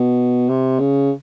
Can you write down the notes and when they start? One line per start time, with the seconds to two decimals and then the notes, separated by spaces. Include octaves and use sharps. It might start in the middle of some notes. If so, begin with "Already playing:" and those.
Already playing: B2
0.49 C3
0.79 C#3